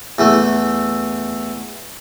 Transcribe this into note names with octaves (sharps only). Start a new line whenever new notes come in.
E2 E3 A3